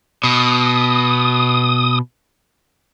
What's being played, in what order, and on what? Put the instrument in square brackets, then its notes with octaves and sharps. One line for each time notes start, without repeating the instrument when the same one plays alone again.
[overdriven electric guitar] B2 [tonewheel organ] D#6